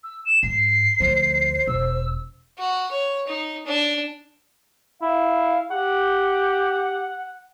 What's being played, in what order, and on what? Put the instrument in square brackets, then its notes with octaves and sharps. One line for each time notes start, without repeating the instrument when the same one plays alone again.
[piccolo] E6
E7
[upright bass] G#2 [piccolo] C7
[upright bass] D2 F3 [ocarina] C5
[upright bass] E1 [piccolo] E6
[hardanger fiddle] F#4
C#5
D#4
D4
[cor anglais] E4 [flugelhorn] F5
[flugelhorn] G4 [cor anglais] F#5